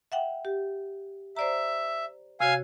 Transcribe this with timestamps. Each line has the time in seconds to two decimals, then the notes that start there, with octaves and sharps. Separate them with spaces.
0.12 E5 F#5 G5
0.45 G4
1.37 C5 D5 E5 A#5
2.40 C3 F#4 C#5 F5 G#5